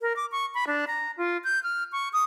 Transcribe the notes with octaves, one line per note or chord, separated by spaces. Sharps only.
A#4
D6
C#6
B5
D4
A#5
F4
G6
F6
C#6
D#6